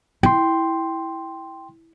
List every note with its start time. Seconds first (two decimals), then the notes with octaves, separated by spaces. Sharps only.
0.23 E4 G5 C6